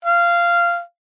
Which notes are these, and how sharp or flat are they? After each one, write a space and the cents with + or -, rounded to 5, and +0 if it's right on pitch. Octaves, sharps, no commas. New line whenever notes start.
F5 -15